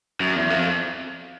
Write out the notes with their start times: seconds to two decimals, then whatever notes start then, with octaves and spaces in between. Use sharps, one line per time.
0.20 F#2
0.35 E2
0.50 F2